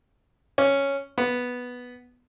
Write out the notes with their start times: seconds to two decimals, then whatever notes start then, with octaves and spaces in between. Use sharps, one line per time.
0.58 C#4
1.18 B3